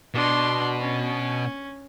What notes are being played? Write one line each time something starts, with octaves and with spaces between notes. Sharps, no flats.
B2 D4 C6
C#4